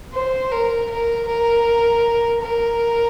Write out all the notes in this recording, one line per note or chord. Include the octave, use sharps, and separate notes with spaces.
C5
A#4
A#4
A#4
A#4